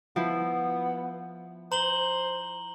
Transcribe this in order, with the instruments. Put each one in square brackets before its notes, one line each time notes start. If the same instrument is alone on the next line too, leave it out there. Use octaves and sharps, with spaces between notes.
[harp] F3 E4 [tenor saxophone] B3
[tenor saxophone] C5 [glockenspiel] A#5 F#7 G7